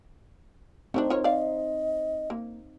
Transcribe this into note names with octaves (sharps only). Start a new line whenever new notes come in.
A3 A#3 C4 D4 D#4
F4 A#4 C#5
D5 D#5 F5
A#3